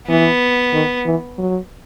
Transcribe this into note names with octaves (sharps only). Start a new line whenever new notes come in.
E3 B3
D#3
E3
F#3